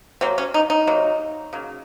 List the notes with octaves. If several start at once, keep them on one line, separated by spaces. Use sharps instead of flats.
C3 F#3 A#3 C4
C#4
D#4
D#4
C3 F#3 A#3
C#3 F#3 A#3